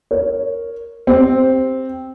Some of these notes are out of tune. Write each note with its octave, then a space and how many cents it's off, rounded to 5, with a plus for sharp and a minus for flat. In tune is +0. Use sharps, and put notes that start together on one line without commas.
A#4 +0 C#5 +0
C4 +0 G4 +0